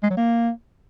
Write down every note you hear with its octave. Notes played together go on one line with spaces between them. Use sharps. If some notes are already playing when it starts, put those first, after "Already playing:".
G#3
F#3
A#3